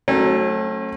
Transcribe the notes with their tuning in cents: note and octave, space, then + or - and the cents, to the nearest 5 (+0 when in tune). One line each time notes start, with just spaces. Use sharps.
F#3 +10 A3 +0 C#4 -45